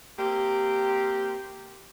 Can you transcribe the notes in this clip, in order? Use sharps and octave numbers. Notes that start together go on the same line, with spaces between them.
A#3 C4 G4